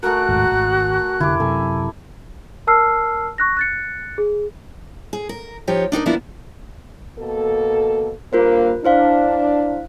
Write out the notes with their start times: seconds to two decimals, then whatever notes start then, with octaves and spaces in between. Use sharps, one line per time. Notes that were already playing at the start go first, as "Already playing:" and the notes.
0.03 A3 F#4 G#4 A#4 F#6
0.29 A1 D#2 G#2
0.51 G#1
1.20 F1 D3 E4 G4 D6
1.40 F#2 C3 A4 G#5
2.67 A#4 A5 E6 F6 C7
3.38 C#6 F#6 A#6
3.57 F#6 A6 C#7
4.18 G#4
5.13 G#4
5.29 A#4
5.67 F3 D#4 G4 C#5
5.92 D4 D#4 F#4 A#4
6.06 E3 F3 A#3 B3 D4 E4
7.18 B2 A#3 A4
8.33 G2 A#3 F4 A#4 C5
8.85 D4 E4 C5 F5